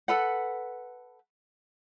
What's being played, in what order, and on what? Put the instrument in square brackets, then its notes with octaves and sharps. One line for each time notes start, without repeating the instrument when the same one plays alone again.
[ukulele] A4 B4 F#5